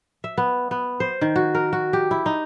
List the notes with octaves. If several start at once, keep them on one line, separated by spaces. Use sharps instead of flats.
E5
B3
B3
C5
D#3
F#4
A#4
F#4
G4
E4
D#4